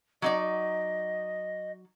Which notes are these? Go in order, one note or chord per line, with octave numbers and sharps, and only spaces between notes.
F#3 D#4 D5 D#5